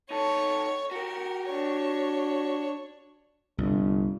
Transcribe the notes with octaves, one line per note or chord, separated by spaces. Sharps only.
D#4 A4 C#5
F#4 G4 A#4
D4 C#5
G1 C2